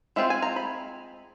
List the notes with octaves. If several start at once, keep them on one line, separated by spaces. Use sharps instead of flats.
G#3 C4 F4 E5
G#5
A#5
B5